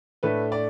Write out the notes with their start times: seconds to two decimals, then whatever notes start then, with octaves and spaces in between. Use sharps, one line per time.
0.23 A2 A3 D4 B4
0.52 D5